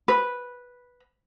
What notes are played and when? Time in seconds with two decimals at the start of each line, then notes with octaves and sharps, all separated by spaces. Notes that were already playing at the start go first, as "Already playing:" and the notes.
0.08 B4